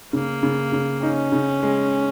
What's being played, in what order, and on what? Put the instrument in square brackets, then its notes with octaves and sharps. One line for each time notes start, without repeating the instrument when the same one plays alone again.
[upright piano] C#3 [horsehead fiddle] A#3
[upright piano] C#3
C#3
[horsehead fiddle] C#4 [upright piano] D#4
[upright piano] C#3
G#3